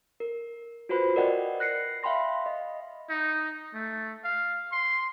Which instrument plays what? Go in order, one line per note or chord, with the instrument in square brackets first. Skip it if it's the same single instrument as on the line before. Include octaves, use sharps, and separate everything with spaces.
[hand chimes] A#4
F4 F#4 B4 C5 B5
A#4 D5 D#5 F#5 G5
F#6 A#6 C7 C#7
E5 F5 G5 B5 C6 A#6
D#5
[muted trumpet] D#4
A3
F5
C6